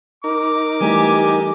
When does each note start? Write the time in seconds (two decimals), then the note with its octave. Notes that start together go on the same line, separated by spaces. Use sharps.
0.24 D#4 A#4 D6
0.80 E3 G3 A3 G4 G#5